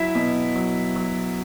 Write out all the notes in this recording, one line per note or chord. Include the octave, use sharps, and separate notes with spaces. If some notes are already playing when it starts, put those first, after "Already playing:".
Already playing: F#3 E4 E5
B2
F#3
F#3